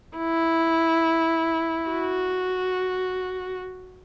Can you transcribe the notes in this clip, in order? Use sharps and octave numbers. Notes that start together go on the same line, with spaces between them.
E4
F#4